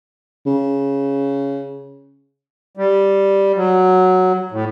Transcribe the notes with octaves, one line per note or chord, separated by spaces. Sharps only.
C#3
G3
F#3
A2